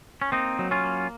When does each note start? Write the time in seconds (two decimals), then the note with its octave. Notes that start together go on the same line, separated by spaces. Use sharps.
0.22 C#4
0.32 A#3 C4 D#4
0.59 F#3
0.71 C#4 F4
0.84 A#3